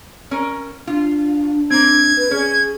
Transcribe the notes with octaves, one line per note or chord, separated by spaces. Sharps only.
C#4 A#4
D4 F4
A#3 C4 G#6
B4
C#4 G#4